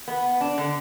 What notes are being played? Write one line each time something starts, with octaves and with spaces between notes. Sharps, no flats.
B3
D4
D3